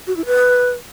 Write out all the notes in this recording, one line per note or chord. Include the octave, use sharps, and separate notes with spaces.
F#4
E4
B4